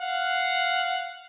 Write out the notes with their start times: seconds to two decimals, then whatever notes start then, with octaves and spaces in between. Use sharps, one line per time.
0.01 F5 F#5